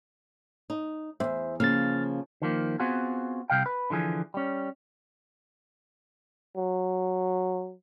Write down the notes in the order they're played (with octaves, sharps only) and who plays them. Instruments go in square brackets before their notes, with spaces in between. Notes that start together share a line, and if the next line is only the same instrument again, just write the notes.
[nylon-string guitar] D#4
[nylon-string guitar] E2 G2 [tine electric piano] C5 E5
[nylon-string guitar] C#3 F3 A#3 [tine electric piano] F6 A6
[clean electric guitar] D#3 F3 A#3
B3 C4 F4 F#4 G#4
C2 C3 F5 G5
B4
D3 E3 F3 G#4
G3 C#4
[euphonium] F#3